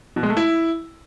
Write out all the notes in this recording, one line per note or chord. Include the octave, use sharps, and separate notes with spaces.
B2
G#3
A3
E4